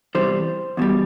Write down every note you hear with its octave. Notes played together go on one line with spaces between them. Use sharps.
E2 C3 E3 G3 C5
E2 B2 G3